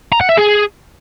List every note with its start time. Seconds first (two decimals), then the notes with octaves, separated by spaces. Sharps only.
0.12 A#5
0.21 F#5
0.29 E5
0.37 G#4